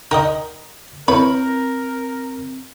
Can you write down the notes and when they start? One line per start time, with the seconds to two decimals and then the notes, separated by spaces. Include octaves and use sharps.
0.11 D#4 A#4 D#5 F#5 G5
1.08 C4 E4 A#4 B4 C#5 B5